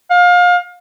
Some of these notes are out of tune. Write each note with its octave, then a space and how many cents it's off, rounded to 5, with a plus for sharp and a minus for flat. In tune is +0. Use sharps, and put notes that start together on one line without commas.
F5 +30